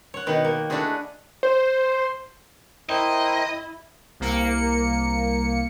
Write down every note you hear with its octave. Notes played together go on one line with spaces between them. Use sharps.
C#5 F#5
B2 D#3 B3
A#3
A3 D4 E4 F#4 G#4
C5
E4 A#4 C5 D#5 G5
C2 A#3 C#7